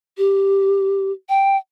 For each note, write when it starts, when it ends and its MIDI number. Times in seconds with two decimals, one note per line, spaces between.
0.18 1.12 67
1.29 1.57 79